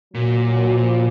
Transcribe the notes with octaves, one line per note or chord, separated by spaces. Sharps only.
A#2 F#3
F#3
F3